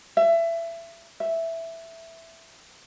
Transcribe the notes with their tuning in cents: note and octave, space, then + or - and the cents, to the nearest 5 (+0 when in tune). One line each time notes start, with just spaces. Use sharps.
E5 +25
E5 +0